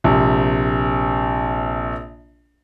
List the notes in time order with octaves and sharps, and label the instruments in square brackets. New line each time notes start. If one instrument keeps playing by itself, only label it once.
[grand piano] A#1 C3